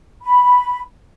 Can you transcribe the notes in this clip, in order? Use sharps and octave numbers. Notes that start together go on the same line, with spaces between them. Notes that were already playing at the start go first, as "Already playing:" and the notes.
B5